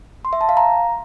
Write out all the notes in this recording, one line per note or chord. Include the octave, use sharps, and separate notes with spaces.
C6
E5
A5
F5
A#5